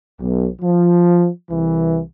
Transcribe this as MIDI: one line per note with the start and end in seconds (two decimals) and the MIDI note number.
0.19 0.47 35
0.61 1.28 53
1.50 2.00 36
1.50 2.00 52